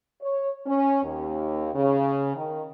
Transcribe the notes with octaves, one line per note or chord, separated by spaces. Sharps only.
C#5
C#4
D#2
C#3
D#3